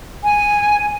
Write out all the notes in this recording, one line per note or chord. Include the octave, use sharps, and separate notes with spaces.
G#5